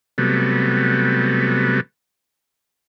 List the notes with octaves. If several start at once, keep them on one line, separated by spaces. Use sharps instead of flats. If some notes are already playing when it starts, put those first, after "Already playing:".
C3 F#3 G3 A3 B3